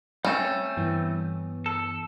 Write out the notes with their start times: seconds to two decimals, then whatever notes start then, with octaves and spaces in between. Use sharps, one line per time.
0.25 G3 A3 C4 C#4
0.77 G2 E3 B3
1.66 A4